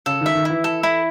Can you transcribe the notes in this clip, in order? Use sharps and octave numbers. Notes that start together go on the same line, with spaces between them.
C#3 A4
D#3 E5
D#3
E3 E4
A4
E4